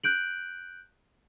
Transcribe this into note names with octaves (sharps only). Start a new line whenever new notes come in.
F#6 G6 D7 F#7